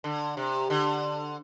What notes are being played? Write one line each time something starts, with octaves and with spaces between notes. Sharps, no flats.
D3
C3
D3